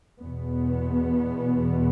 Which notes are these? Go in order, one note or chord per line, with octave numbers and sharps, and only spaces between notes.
E2 B2 B3